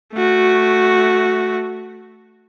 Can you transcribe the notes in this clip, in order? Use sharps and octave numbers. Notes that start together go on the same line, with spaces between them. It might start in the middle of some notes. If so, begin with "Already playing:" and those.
A3 F#4